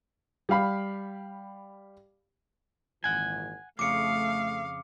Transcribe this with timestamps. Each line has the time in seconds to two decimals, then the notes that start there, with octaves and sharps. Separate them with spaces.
0.49 G3 G4 F5 B5
3.04 G#1 A#2 E3 F#5 G#5
3.79 F2 C#3 A3 F5 D6 C#7